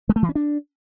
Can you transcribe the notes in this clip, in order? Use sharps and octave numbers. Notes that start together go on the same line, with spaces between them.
G#3
A3
E3
C#4
D4